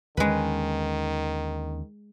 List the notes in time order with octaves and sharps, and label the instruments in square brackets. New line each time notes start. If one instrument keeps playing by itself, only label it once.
[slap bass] D#2 D3 C#4 [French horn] D#3 [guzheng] G#3 B4